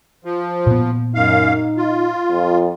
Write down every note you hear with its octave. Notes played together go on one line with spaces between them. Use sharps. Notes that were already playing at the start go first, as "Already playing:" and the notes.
F3
A#2 B3
F#2 D#4 F5
F4
F2